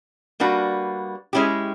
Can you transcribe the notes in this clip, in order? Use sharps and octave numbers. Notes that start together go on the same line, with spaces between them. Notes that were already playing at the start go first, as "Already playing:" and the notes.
G3 A#3 D4 F#4 B4
G#3 C#4 E4 G4